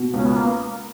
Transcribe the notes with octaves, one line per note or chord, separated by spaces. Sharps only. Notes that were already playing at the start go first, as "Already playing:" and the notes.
Already playing: B2
C#2 C#4
B3
A#3